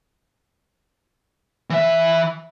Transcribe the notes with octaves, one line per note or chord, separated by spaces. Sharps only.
E3 E5